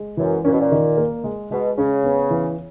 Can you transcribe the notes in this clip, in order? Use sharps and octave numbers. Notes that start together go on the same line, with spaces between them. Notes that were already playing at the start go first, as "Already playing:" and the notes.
Already playing: G#3
F#2 E3
A#2 C#4
B2
A#2
D#3
A#3
G#3
B2 G#3
C#3 C#4
B3
E3